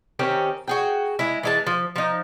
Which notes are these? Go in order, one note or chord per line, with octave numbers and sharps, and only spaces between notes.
D#3 C4 C#4 G4
F#4 G#4 G5
G#3 E4
E3 G#3 A5
F3
F3 D#4